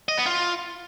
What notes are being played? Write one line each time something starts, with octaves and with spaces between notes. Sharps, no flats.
D#5
B3
F4